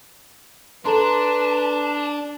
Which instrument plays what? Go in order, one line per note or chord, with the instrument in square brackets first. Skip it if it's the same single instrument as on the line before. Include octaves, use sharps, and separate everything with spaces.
[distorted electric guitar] D4 [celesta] A4 A#5 C6 [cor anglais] B4 [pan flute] A5